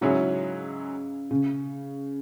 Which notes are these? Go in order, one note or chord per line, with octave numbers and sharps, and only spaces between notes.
G#2 C#3 F#3 C#4 E4 G#4
C#3